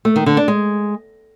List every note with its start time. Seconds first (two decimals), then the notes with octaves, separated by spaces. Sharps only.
0.05 A3
0.16 D#3
0.26 D3
0.37 D4
0.48 G#3